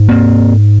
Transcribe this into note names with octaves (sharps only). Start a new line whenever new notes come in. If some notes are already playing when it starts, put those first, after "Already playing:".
Already playing: G#2
A#3 C4